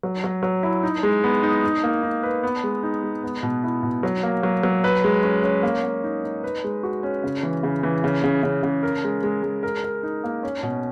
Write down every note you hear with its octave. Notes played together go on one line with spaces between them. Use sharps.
F#3
F#3
F#3
E4
D#4
G#3
B3
D#4
D#4
A#3
D#4
B4
B3
G#3
D#4
G#3
B3
B2
E4
B2
F#3
A#3
F#3
F#3
B4
G#3
C#4
C#4
A#3
A#3
D#4
D#4
B4
G#3
F#4
C#4
C#3
E3
C#3
E3
C#3
C#3
C#3
C#3
A#4
G#3
G#3
G#3
A#4
A#4
D#4
A#3
C#4
B2